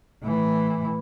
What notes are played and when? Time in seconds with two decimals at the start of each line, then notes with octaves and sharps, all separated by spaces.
0.23 A2 E3